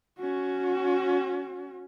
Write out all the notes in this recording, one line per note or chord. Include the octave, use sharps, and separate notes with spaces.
C#4 F#4